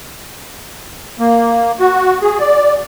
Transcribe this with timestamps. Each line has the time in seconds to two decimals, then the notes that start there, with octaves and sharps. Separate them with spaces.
1.20 A#3
1.79 F#4
2.21 G#4
2.39 D5